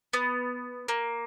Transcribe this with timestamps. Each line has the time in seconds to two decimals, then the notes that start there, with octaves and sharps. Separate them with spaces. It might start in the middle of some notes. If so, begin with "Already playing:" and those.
0.13 B3
0.88 A#3